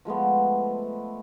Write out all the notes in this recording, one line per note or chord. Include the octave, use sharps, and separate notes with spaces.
F3 G#3 A3 B3